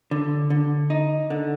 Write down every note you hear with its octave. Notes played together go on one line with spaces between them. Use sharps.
D3
D3
D#4
D3